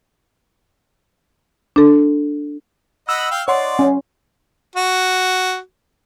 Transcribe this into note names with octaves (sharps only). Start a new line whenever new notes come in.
D4 A4
D#5 F#5 B5 E6
F5 G5
D#4 C#5 D5 F#5 C6
C#4
F#4